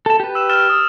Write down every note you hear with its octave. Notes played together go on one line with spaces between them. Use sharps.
A4 A5
G4 B4
E6 E7
F6 A6 E7
D#6